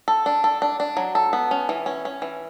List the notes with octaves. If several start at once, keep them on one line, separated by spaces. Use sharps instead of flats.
A4
D4
A4
D4
D4
F#3
A4
B3
C#4
E3
C#4
C#4
E3